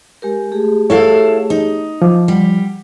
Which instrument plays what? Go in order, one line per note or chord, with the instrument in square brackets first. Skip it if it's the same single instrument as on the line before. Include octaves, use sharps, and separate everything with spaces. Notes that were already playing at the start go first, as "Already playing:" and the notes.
[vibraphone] G#3 G4 A#4
A3 G4 G#4
[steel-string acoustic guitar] E4 A4 F5 [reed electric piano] C#5
[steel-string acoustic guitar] D#4
[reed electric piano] F3 [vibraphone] D#5 D6
[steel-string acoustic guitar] G3 [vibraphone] F#5